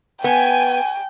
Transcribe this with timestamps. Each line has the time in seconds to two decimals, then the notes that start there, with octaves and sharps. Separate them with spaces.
0.24 B3 G5 G#5